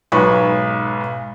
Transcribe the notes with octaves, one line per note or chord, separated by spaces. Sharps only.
B1 G#2 B4 C#5 B5 C#6